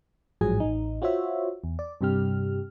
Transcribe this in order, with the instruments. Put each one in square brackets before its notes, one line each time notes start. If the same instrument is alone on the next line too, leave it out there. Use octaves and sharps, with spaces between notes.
[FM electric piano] A1 G#2 F3 F#3 G#4 G#5
A1 D#4
F4 F#4 C5 C#5 E5
E2
D5
G2 C3 G3 G4 F6